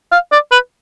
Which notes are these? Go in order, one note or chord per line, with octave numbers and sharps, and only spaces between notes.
F5
D5
B4